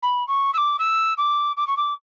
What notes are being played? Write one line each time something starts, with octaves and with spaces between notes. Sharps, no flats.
B5
C#6
E6
D6
E6
D6
D6
C#6
D6